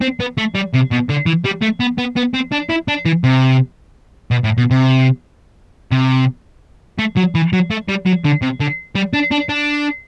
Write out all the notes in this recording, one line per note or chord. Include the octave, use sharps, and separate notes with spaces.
C4
B3
A3
G3
C3
B2
D3
E3
G3
A3
B3
B3
B3
C4
D4
E4
D4
E3
C3
B2
A2
B2
C3
C3
A3
F#3
E3
F#3
A3
G3
F#3
D3
C3
D3
G3
D4
D4
D4